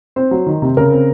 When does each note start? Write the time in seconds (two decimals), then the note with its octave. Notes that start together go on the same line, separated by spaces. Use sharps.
0.16 C4 C5
0.31 F#3
0.46 D#3
0.62 C3
0.77 C#3 A#4
0.92 C4